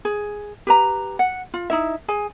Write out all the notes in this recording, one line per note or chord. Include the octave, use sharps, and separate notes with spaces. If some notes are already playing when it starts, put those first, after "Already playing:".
G#4
G4 B4 A#5
F#5
F4
D#4 E4 E5
G#4 G#5